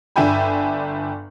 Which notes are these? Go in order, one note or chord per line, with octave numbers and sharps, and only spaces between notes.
G1 D4 E5 G5 G#5 B5